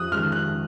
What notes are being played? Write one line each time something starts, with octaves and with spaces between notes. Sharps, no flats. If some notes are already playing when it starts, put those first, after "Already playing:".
Already playing: F2 D#6 F#6
D#3 G#3 F6
F#6